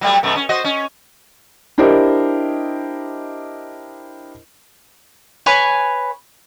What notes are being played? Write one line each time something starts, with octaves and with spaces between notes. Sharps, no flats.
F#3 G3 A3
F#2 B2 A3
C#4
F#4 C5 D#5
C#4
D4 E4 G4 A#4 C5 D#5
B4 C#5 G#5